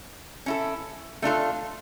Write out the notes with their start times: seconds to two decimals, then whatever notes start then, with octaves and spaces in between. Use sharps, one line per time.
0.46 C#4 E4 A4
1.22 A3 D4 F4 A4